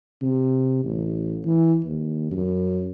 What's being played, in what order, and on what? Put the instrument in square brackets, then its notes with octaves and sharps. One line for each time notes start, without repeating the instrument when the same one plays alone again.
[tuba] C3
A1
E3
D#2
F#2